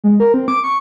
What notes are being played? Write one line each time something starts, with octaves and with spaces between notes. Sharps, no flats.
G#3
A#4
C4
D6
C#6